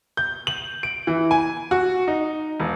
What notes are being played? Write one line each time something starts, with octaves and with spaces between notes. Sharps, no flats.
G6
F#7
D7
E3
G#5
F#4
D#4
E1